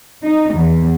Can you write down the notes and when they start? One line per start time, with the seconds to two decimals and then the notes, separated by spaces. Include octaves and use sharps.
0.24 D#4
0.55 E2